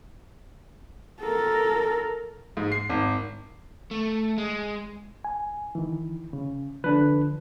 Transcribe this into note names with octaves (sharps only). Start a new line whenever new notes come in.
A4 A#4
G#2
C7
G#1
A3
G#3
G#5
D#3 E3
C#3
D3 F3 D4 B4